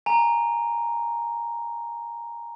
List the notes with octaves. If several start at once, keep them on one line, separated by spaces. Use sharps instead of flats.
G#5 A#5